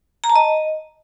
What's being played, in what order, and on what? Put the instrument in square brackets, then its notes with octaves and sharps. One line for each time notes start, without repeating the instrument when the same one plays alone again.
[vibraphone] A#5
A5
D#5